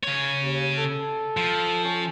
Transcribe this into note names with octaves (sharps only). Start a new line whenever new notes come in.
C#3 C#5
D#2
A4
F3
C#4